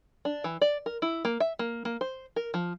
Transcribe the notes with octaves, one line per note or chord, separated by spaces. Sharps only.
D4
E3
D5
A#4
E4
A#3
E5
A#3
A#3
C5
A#4
F3